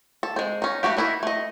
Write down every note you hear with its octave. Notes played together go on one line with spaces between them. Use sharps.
A4
G#3 C4
C#4 D#4
G3 A3 F#4 G4
E3 D#4 E4 A#4 E5
A3 D#5